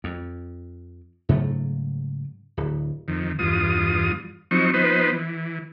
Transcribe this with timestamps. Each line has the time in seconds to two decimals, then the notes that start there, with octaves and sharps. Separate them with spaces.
0.04 F2
1.29 G#2 C#3 F#3 A3
2.57 D1
3.08 F2 D#3
3.39 E2 G2 F4 D#6
4.51 F3 F#3 C4 D#4 C#6
4.74 F3 B3 D#4 B4 C5
5.12 E3